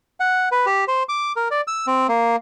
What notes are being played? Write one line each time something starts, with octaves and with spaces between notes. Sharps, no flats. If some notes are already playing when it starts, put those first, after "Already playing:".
F#5
B4
G4
C5
D6
A#4
D5
E6
C4
A#3